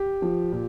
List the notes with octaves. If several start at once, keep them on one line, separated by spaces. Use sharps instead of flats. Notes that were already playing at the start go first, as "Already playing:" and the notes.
Already playing: G4
F3
A#2